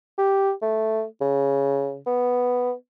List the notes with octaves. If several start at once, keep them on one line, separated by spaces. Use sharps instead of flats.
G4
A3
C#3
B3